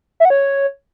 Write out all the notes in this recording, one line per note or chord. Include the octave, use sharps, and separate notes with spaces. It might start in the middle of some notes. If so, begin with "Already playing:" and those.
E5
F#5
C#5